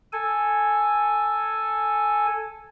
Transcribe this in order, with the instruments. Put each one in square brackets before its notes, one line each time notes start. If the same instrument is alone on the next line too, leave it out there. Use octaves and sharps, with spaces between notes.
[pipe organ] A4 G#5